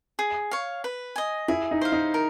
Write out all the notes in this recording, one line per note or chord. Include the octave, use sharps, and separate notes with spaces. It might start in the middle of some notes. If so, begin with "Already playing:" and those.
G#4
C#5 F5
B4
D#5 G#5
E4 G#4
D#4
C5 F5
D#4
A#4